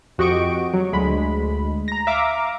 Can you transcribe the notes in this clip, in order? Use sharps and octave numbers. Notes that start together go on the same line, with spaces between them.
F2 F#4 G4 D#5 C#6 D7
F#3
D2 G#3 B5
A#5 A#6
E5 F5 A#5 D6